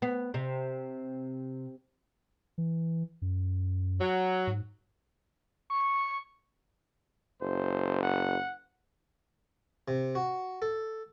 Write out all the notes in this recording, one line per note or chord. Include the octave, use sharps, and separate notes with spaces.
B3
C3
E3
F#2
F#3
G#2
C#6
F#1 C5
F#5
C3
F#4
A4